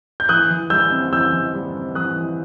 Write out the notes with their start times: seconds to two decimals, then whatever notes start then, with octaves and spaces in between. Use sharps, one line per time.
0.20 G6
0.29 E3 D#6 F#6
0.51 E3
0.70 G3 E6 G6
0.92 C4
1.12 E3 E6 G6
1.33 E3
1.54 G3
1.74 C4
1.95 E3 D#6 F#6
2.16 E3